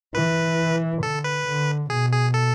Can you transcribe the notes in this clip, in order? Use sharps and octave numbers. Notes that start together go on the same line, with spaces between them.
E3 B4
D3 A4
B4
D3
B2 G#4
G#4
A4